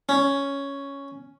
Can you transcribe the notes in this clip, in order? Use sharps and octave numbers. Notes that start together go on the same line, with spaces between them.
C#4